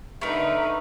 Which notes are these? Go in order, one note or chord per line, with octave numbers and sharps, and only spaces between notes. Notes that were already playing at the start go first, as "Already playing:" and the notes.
D3 A3 D#4 A#4 B4